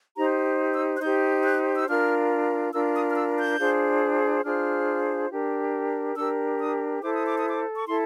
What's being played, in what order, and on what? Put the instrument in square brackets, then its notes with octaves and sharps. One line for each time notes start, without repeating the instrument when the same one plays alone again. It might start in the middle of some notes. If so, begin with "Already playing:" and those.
[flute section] D#4 G4 C5 A#5
E6
F#6
D#4 G4 C5 G6
F#6
E6
D4 F4 A#4 F6
D4 F4 A#4 E6
D#6
F6
E6
G6
D4 F4 G#4 C5
D4 F4 G#4 C5 F6
D4 G4 A#4
D4 G4 A#4 E6
D#6
E4 A4 C5 D6
D#6
D6
D#6
D6
C#6
E4 A4 C6